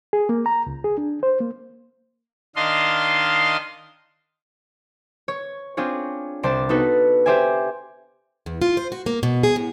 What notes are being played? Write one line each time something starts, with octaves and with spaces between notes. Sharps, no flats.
G#4
A#3
A#5
C#2
G#4
D4
C5
A#3
D#3 D4 D#5 F5 C6
C#5
C4 D4 F4 G#4 C#5
C2 C5 D5 A5 A6
B3 D#4 F#4 A4 B4
G4 C5 D5 E5 G#5
E2
F4
C5
F#4
A#3
B2
G#4
A2